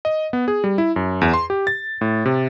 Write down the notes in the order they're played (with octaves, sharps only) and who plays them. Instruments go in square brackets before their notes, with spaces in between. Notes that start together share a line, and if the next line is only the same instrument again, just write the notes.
[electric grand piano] D#5
B3
G#4
G3
E4
F#2
E2
C6
G4
A6
A2
C3